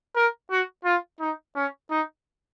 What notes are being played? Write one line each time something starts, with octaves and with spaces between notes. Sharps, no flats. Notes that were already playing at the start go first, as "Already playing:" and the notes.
A#4
F#4
F4
D#4
C#4
D#4